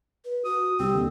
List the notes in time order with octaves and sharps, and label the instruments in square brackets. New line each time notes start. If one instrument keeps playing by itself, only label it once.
[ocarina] B4
[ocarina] F#4 [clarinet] D#6
[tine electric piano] C2 [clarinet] C4 [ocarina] G4
[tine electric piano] D#2 D3